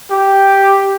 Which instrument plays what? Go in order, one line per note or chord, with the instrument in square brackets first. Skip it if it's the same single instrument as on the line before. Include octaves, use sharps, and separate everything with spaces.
[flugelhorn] G4